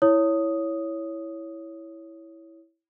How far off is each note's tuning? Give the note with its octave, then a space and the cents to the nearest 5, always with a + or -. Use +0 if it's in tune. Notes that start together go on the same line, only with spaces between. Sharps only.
E4 +0 C#5 +5 D#6 +0